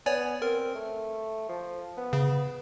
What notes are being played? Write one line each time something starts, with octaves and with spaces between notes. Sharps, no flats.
B3 C#5 D5 G#5
C4 A#4
A3
F3
B3
C#3